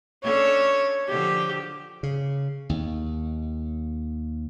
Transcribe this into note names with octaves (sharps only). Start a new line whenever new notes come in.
C#4 D4 A4 C#5
D3 F3 G4
C#3
D#2